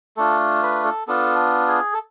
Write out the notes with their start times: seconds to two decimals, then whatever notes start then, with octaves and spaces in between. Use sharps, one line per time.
0.17 A3 D4 F4 A4
0.62 B4
0.85 A4
1.07 B3 D4 F4 A4
1.68 G#4
1.94 A4